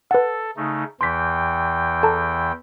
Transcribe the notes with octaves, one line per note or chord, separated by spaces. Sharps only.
A4 B4 F#5
C#3 A3 D#4
E2 E3 G5 C6 B6
A4 A5 A#5